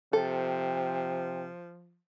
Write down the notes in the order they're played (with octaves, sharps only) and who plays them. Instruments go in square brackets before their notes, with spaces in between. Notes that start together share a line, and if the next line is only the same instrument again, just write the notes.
[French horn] C3 [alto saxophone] F3 [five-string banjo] A4 [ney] G5